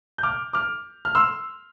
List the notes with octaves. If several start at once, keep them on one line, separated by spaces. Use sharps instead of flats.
G6
D6 F6
D6 F6
F6
C6 E6